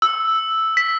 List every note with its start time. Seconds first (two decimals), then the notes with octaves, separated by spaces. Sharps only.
0.02 E6
0.77 B6